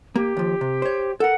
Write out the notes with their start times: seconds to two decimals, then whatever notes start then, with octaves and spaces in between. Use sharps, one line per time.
0.16 A#3 G4
0.37 D#2 F3
0.61 C3
0.82 C5 C#5
1.20 A4 A#4 F#5